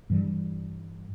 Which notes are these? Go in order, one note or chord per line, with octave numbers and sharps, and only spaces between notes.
G2 E3 G3